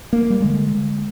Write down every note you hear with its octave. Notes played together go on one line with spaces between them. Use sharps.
A#3
G3
D3 G#3